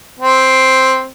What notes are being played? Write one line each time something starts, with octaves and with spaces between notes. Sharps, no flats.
C4